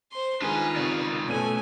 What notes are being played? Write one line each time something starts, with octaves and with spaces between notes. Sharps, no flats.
C5 C6
D#3 G#3 D4 F4 B4 G#5
C#2 C3 C#4 D5
B2 A3 C#4 B4 G#5 D#7